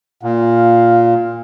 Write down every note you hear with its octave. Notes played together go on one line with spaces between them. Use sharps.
A#2 F5